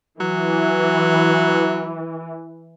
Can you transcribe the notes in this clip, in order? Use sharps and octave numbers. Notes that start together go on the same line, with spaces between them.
E3 F#3